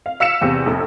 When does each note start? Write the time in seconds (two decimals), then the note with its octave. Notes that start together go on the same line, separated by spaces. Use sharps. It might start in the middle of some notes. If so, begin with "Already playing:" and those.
0.06 F5
0.20 F5 E6 B6 C#7 E7
0.41 E2 C3
0.66 F1 A#1